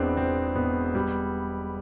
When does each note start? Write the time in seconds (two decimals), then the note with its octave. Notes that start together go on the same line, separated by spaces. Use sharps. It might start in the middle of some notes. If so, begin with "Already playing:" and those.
Already playing: E1 E2 B3 C4 D4
0.17 E1 C4
0.56 E1 B3
0.95 G3